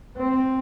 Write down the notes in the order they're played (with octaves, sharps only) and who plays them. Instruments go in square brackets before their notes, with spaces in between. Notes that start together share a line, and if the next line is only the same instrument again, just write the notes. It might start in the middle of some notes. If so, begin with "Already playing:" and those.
[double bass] C4